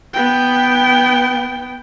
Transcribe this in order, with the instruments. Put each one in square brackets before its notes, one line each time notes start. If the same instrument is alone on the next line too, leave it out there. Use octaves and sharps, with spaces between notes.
[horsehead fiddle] B3 G5